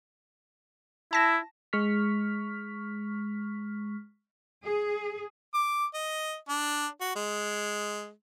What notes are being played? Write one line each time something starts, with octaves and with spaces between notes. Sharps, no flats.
E4 A5 A#6 E7
G#3 C#6 F6 B6
G#4
D6
D#5
D4
F#4
G#3